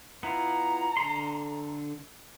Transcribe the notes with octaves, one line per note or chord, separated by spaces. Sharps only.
B3 E4 F4 A#5
D3 A4 C6